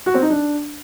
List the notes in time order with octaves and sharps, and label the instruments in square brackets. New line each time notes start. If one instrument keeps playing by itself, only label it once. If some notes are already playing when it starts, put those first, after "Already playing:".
[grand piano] F#4
C4
D#4
D4